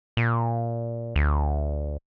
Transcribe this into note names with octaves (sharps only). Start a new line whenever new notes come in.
A#2
D2